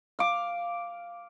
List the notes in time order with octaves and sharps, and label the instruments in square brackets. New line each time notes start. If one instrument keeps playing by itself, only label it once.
[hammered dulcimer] F5 D6